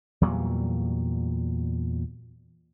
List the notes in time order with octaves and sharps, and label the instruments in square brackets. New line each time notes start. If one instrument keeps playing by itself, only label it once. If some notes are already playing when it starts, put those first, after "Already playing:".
[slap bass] E2 A#2 F#3 G3